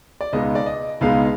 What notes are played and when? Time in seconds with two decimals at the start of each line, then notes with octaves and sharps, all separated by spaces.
0.21 D5
0.33 C#2 B2 G#3 B3 D#4 D#5
0.55 D5
0.66 D#5
1.01 C#2 B2 G#3 B3 D#4 F5